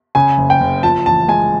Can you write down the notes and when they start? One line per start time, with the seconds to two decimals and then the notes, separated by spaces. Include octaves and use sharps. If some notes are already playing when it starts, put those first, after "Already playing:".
0.15 C#3 G#5
0.38 F#1
0.50 G5
0.61 F#1
0.83 F3 A5
1.06 A1 A5
1.28 G#3 G#5